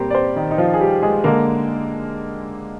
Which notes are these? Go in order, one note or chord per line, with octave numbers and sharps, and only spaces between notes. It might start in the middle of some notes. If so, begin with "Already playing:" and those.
Already playing: A#2 G3 C4 G4 A#4 C5
D5
C4 C5
D#3 D#4
D#4
F3 F4
G#4
G3 G4
G#3 G#4
D3 G#3 A#3 A#4